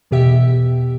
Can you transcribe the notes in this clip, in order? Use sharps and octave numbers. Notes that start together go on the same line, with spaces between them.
E2 B2 G4 E5